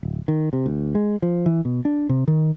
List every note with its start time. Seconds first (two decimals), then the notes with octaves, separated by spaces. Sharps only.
0.03 D1
0.28 D#3
0.53 C3
0.66 D2
0.95 G#3
1.22 F3
1.46 E3
1.65 B2
1.85 D4
2.09 C3
2.28 D#3